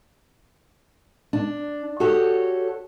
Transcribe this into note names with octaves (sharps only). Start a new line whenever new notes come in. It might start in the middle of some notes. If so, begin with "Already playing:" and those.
D4
F#4 G4 A4 C#5